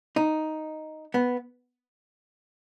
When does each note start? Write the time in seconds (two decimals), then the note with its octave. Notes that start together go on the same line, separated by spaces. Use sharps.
0.16 D#4
1.14 B3